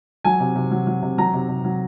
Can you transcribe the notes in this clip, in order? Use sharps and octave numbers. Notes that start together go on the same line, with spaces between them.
F#3 G#5
C3
C3
F#3
F#3
C3
F#3 A#5
C3
C3
F#3